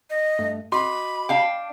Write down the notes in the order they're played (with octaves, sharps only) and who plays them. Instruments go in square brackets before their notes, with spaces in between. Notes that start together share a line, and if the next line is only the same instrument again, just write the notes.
[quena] D#5
[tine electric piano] G2 A3
[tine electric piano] F#4 D#5 D6 [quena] B5 [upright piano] C6
[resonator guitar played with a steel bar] D4 F5 G5